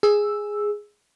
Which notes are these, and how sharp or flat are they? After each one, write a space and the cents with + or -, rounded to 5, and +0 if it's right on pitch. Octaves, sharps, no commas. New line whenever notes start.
G#4 +0 E6 +0